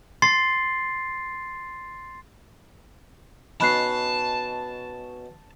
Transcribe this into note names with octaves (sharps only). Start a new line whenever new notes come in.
C6 A6 C7
B2 C#4 D#4 A5 B5 F#6 C7